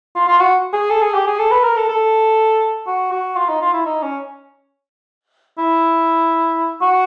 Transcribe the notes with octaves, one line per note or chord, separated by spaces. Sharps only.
F4
F4
F#4
G#4
A4
G#4
G4
G#4
A4
B4
A#4
A4
A4
F#4
F#4
F4
D#4
F4
E4
D#4
C#4
E4
F#4